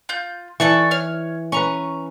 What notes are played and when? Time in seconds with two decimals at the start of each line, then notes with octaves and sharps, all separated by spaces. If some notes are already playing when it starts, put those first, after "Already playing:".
0.09 F4 G6
0.60 E3 A4 D5 C#6
0.91 C#5 F6
1.52 C#4 B4 A#5 C#6